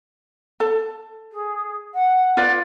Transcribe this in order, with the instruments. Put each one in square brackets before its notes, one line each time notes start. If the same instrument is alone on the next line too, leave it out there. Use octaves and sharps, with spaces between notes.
[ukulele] A4 A5
[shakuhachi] G#4
F#5
[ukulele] F4 B4 D5